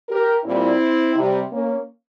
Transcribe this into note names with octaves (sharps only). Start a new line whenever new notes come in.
G4 A#4
A#2 G3 C4 E4
C3 G3
A#3 C#4